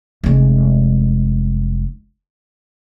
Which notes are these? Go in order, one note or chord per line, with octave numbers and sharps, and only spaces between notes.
F1 G#3